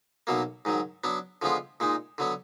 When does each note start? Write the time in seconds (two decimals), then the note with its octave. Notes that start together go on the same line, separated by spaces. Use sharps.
0.27 B1 B2 F#3 A#3
0.65 G#2 D#3 F#3
1.04 F#3 B3 D4
1.42 D3 F3 G#3 B3 F4
1.80 A#2 G#3 D#4
2.18 D3 F#3 B3